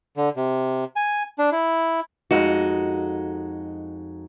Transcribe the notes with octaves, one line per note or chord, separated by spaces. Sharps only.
D3
C3
G#5
D4
E4
F2 G#3 D#4 F#4